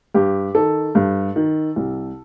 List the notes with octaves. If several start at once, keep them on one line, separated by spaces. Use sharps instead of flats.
G2 G4
D#3 A4
G2
D#3
C2